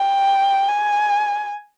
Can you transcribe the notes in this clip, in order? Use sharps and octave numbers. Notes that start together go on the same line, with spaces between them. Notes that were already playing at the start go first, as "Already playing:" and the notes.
Already playing: G5
G#5